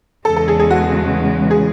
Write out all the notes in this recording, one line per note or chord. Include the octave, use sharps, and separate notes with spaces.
E2 C#3 G#3 A4
A4
G#4
G#4
F#4
G#4